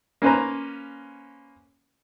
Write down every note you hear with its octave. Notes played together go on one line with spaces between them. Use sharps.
A#3 C#4 B4 C5 A#5